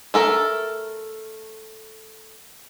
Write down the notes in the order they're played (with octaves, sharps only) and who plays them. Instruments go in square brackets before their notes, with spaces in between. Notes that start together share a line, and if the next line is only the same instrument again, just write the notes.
[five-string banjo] A3 A4 A#4